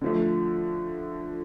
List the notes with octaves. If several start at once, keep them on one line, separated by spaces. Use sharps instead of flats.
D3 F3 A3